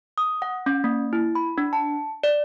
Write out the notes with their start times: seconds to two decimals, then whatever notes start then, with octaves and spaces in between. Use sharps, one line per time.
0.18 D#6
0.42 F#5
0.66 C#4
0.84 A#3
1.13 E4
1.35 B5
1.58 D4
1.73 A5
2.23 D5